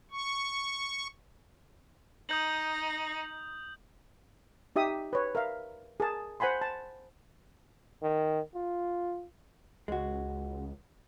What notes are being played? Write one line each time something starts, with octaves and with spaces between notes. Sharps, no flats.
C#6
D#4 D#6 G6 F#7
D#4 G4 E5 D#6
B4 C#5
A#4 E5 F5
G#4 A#4 A5
C5 F#5 G#5 B5 C6
A5
D#3
F4
C#2 G#3 F#4